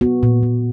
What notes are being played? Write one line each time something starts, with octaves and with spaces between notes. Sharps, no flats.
B3 F#4
A#2
A#2